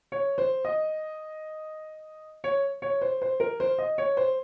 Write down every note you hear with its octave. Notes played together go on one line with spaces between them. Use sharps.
C#5
C5
D#5
C#5
C#5
C5
C5
A#4
C5
D#5
C#5
C5